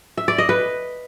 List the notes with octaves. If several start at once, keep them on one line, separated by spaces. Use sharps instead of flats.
E5
D5
D#5
B4